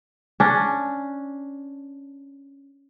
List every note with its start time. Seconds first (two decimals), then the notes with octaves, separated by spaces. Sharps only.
0.40 C#4 D4